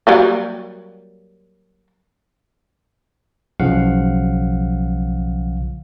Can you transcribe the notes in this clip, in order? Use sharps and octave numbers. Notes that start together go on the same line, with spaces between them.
F#3 G3 A#3
B1 C#3 F3 F5 F#5